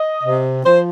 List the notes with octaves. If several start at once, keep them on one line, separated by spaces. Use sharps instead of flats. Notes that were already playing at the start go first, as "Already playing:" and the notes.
Already playing: D#5
C3
F3 C5